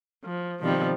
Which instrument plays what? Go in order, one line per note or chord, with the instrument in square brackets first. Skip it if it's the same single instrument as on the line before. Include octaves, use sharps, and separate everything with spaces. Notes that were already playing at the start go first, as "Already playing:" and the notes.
[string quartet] F3
B2 D#3 F3 G3 C4